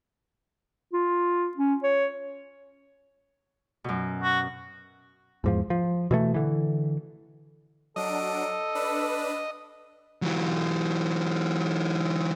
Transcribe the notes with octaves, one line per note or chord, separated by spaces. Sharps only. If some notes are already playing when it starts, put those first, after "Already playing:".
F4
C#4
C#5
F#2 B2
F#4
E2 G#2 F3
F3
B2 E3 A3
D3 E3
F#3 D4 A4 D#5 D7
D4 B4 E6
E3 F#3